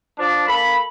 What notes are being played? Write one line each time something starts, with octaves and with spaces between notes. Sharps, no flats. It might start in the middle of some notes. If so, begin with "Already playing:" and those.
F3 D4
A#3 A4 B5